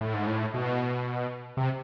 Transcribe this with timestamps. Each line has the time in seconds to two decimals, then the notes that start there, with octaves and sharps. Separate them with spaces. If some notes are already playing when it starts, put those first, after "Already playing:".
0.01 A2
0.14 G#2
0.27 A2
0.54 B2
1.57 C3